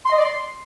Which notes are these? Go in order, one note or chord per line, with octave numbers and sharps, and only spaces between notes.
C6
D#5
D5
C6